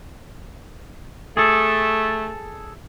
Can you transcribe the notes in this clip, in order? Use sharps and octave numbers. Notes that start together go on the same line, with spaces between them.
A3 G#4 A4